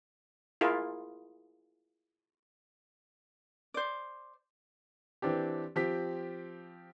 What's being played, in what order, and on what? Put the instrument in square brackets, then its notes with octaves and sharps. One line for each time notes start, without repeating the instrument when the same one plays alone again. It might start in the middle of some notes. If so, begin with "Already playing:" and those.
[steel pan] E4 F4 G#4 A#4
[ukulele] C5 D5
[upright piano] E3 C4 D4 G4
F3 C4 G4 B6